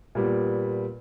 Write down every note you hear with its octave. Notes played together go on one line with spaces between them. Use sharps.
A#2 G3 B3